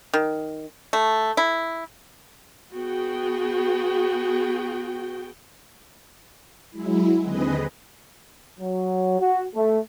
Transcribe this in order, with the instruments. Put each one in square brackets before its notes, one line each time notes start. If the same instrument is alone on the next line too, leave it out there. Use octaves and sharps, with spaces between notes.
[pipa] D#3
A3
E4
[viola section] B3 F#4 G#4 G5
[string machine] F#3 G#3 E4
D#2 D3 C4 G#4 B4 D#5
[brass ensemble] F#3
F#4
A3